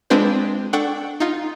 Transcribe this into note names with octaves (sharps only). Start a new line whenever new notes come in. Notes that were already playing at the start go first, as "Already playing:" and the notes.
G#3 C4 D4 F4 B4 C5
D4 A4 F#5 G5 C#6
D#4 F4